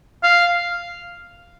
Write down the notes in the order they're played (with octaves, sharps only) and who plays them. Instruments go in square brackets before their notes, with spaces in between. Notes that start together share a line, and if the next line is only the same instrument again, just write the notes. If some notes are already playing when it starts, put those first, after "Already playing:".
[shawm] F5